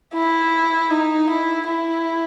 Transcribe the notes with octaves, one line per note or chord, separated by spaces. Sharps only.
E4
D#4
E4
E4